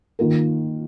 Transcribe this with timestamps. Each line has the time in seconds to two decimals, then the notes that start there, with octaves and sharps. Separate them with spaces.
0.19 D#3 A#3 F4 A#4